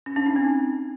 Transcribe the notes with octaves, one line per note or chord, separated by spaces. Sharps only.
C#4
D4
D#4
C4